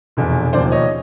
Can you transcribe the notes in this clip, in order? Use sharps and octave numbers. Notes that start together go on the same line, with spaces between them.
F1 E2 B2
E1 D#2 C#3 F3 C5 D5
C#5 D#5